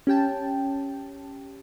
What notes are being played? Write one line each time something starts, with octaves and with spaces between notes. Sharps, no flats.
C#4 G4 G5 A5